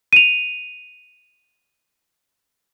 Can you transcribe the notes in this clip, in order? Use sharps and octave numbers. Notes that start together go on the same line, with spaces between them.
D#7 F7